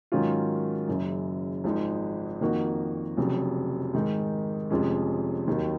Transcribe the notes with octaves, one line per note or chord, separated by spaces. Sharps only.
G#2 D#3 F#3 C#4 F4
F#1 F#2 C#3
G#1 G#2 F3 G#3 D#4
F2 D#3 A#3 D#4 F#4
F1 F2 C#3 F#3
G#2 D#3 G#3 D#4
F1 F2 F3 G#3 C#4
D#2 D#3 F#3